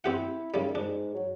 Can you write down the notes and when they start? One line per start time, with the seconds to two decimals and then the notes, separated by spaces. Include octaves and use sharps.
0.04 C4 E4 G4 F#5
0.54 D#2 C#3 G3
0.75 G#2 D4
1.14 F#3